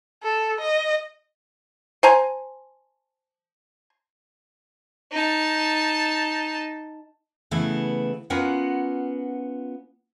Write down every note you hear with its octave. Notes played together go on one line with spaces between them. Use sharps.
A4
D#5
C5 G#5 A#5
D#4 A5
C#3 E3 A3 B3 E4
B3 C#4 F4 A#4 F#5